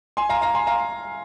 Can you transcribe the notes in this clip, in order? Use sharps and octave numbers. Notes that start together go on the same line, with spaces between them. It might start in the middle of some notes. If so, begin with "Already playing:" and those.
G#5 C6
F5 A#5
F5 A#5
G#5 C6
F5 A#5